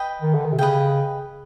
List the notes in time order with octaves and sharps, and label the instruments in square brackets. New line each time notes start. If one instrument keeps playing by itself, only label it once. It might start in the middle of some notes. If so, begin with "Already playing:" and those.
Already playing: [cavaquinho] B4 D#5 G5
[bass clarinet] D#3
D3
D#3
C3
[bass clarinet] C#3 [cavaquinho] B4 D#5 G5